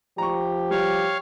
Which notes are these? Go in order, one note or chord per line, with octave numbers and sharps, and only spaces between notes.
F3 G4 A#5 C#6
G3 C#5 F5